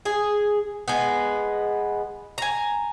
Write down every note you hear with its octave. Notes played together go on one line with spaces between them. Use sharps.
G#4
G#3 B3
G#5 A#5